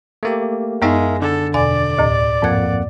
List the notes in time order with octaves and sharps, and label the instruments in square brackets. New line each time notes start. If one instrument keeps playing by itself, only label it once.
[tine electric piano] A3 A#3 G4
[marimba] F#2 B3 D#4 [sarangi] G#3 [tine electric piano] A#4 E5 F5
[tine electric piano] D3 [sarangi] A4
[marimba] E2 B2 G#5 [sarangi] D5
[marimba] D2 A2
[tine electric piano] F2 A#3 F#5 [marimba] G#2 G#6